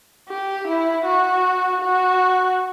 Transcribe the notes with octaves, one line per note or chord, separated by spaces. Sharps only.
G4
E4
F#4
F#4